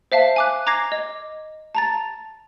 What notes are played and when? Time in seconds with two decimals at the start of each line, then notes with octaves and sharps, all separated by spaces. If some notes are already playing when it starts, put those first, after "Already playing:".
0.12 C5 E5 F5 A5 C7
0.36 G#5 D6 F#6
0.67 A#5 D6 G#6 A#6 C7
0.92 D#5
1.75 A5 A#5 A6